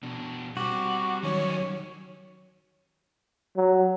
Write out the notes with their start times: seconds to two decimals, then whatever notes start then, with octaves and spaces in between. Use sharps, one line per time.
0.03 B2 D4
0.57 G3 C4 F#4 D6
1.23 D#3 F#3 G3 C#4 C#5
3.57 F#3